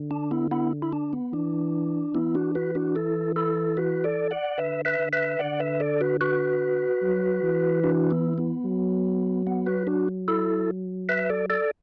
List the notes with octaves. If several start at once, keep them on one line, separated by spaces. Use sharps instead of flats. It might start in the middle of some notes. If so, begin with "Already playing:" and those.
Already playing: D3
D4
B3 E4
B3 E4
E4
D4
B3
E3 D4
E3 B3 E4
D4 F#4
F#4 B4
D4 F#4
E4 A4
E4 A4
F#4 B4
A4 D5
D5 F#5
D3 B4 E5
B4 E5
D3
B4 E5
D3 D5 F#5
B4 E5
A4 D5
F#4 B4
F#4 B4
F#3
E3
D4 F#4
B3 E4
B3
F#3
B3
F#4 B4
D4 F#4
E4 A4
B4 E5
A4 D5
A4 D5